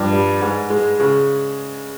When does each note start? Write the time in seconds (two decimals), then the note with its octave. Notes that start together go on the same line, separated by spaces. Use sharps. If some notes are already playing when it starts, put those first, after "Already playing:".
Already playing: G2 F3
0.12 G3
0.41 G#2
0.70 G#3
0.99 C#3